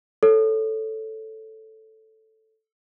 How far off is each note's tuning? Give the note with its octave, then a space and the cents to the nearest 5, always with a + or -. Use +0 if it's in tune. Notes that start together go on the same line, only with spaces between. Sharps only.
A4 +0 C#5 +0